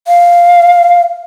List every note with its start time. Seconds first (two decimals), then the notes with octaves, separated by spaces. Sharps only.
0.08 F5